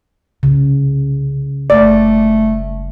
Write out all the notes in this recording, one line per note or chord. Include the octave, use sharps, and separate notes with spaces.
C2 C#3
F#1 G3 A3 D5